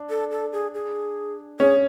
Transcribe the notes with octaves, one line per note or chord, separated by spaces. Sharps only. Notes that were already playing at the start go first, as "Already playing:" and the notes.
Already playing: D4
A4
A4
G#4
G#4
C#4 G#4